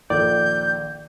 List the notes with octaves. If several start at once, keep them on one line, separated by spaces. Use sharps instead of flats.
A#1 D#3 A4 D5 G6